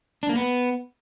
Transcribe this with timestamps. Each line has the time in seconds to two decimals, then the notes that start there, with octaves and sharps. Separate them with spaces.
0.23 D4
0.29 A#3
0.36 B3